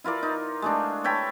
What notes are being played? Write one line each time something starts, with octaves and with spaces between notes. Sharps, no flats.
E4 F4 A#4 D5
D#4
G#3 A3 D4
A4 C#5 G5 B5